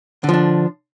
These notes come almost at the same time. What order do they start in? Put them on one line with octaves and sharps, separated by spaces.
D3 F3 D4